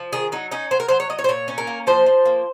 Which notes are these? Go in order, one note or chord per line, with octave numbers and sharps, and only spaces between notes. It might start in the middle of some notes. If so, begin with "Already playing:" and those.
Already playing: F3
D#3 G#4
F#3 D#4
C#4 D#4
F#3 C5
A#4
F#3 C5
C#5
F#3 D#5
C#5
C5
A#2 C#5
C#4
A#4
A#3
F3 C5
F3
A#3